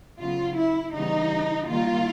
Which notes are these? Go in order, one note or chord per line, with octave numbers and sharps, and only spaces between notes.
C#3 F#3 B3 F4
E4
C#3 E3 G3 B3 D#4
D#3 G3 A#3 F4